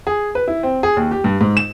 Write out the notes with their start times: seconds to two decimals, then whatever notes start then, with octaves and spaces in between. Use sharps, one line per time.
0.07 G#4
0.35 B4
0.48 E4
0.63 C4
0.83 G#4
0.97 D#2
1.11 G4
1.24 G2
1.41 G#2
1.57 E7